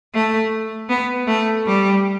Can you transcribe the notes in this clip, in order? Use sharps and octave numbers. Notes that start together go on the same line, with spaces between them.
A3
B3
A3
G3